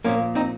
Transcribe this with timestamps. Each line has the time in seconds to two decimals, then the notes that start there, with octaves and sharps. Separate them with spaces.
0.05 A#2 F3 A#3 C#4
0.35 C4 D#4